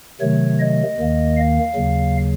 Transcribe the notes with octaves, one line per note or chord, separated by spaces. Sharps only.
C3 D#3 F#3 A3 C#5
D#5
D#2 D#3 A#3
F5
D#2 C#3 F#3